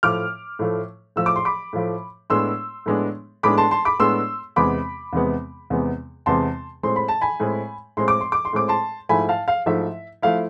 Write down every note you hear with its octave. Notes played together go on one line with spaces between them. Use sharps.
A2 F3 A3 D6 F6
A2 F3 A3
A2 F3 A3 E6
D6
C6
B5 D6
A2 F3 A3
A2 G#3 B3 D4 C6 E6
A2 G#3 B3 D4
A2 G#3 B3 D4 B5 D6
A5 C6
A5 C6
B5 D6
A2 G#3 B3 D4 C6 E6
E2 C3 G#3 B3 B5 D6
E2 C3 G#3 B3
E2 C3 G#3 B3
E2 C3 G#3 B3 A5 C6
A2 G#3 C4 C6
B5
A5
G#5 B5
A2 G#3 C4
A2 G#3 C4 C6
D6
C6
D6
C6
A2 G#3 C4 D6
A5 C6
G#2 F3 A3 E4 G#5 B5
F5 A5
F5
G#2 F3 A3 E4 E5
F3 A3 E4 F5